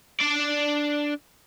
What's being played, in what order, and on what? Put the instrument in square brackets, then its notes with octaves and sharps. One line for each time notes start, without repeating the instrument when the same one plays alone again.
[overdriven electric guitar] D4 D5